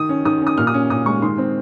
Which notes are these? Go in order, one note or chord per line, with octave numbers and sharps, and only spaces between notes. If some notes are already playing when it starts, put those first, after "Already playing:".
Already playing: D#3 D#6
C#4
D#3 D#6
C#4 D#6
A#2 F6
D#6
C#4
A#2 D#6
G#3 C#6
D#3 C6
C4